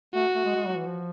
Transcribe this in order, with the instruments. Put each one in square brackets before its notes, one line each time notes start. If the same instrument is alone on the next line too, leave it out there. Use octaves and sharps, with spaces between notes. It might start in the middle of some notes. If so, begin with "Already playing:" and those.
[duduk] A3 [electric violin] F#4
[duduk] A3
G#3
G#3
F#3
E3
F3